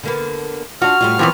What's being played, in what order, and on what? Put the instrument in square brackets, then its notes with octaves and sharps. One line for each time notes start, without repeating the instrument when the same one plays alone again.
[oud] D3 A#3 B3
[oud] D4 F4 [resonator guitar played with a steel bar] F#4 [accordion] F6
[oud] A2 G3 F4
[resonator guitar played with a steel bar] F#2 E3 F3 [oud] B3 C4